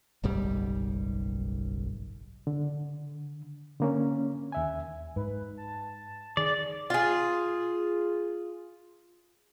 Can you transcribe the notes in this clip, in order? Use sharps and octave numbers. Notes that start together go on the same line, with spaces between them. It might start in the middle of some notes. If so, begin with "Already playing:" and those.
F#1 B1 G#2 G3
D3
D3 A#3 C#4
D#2 E5 G#5
G#2 B4
A5
D#3 G#4 D5
F4 G#4